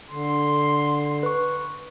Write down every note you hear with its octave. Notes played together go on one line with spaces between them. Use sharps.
D3 C6
B4 C#6